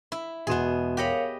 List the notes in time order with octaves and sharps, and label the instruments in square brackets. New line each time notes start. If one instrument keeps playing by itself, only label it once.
[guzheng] E4
[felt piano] E1 C6 E7 [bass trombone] B2 [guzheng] B3 G#4
[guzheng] G4 D#5 B5 [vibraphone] A#4 C#5 F5